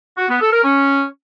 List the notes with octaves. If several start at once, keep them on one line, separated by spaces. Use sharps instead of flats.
F#4
B3
A4
A#4
C#4